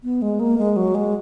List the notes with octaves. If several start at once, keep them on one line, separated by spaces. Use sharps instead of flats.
B3
G#3
A#3
G#3
F#3
G#3